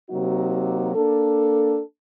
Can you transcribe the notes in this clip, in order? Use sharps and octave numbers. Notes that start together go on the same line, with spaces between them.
C3 F#3 A#3 D#4 F#4
A#3 D4 A4